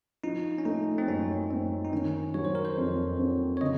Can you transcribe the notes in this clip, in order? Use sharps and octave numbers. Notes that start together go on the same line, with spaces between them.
F3 D#4
C#4
A3 D#4
C4
F#2 C#4
F#2 C4
D#4
D#3 C#4
F#3 C#5
C5
A#4
C5
F2
C4
C#5
C#3 D#5